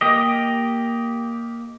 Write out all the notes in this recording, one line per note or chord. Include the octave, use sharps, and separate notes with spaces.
A#3 G4 D#5